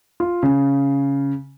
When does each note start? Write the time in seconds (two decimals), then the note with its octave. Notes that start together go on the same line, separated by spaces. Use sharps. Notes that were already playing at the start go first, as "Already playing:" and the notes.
0.20 F4
0.43 C#3